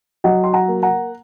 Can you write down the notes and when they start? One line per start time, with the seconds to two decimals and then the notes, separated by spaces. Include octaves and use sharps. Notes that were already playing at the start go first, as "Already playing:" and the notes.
0.24 F#3 D#5 F#5
0.44 C6
0.53 F#5 A#5
0.68 A#3
0.83 F#5 A#5